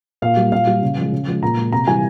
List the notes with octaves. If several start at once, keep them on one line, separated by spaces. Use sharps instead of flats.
A#2 F5
G3
A#2 F5
G3
C#3
F3 G#3
C#3
F3 G#3
A#2 A#5
G#3
C3 A#5
E3 G3 G#5